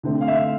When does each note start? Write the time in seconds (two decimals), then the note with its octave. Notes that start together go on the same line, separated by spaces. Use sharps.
0.03 D3 A3 C4
0.21 F5
0.28 E5